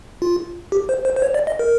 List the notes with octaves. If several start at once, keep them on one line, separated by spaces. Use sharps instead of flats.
F4
G4
C5
C5
C5
C#5
D5
D#5
A#4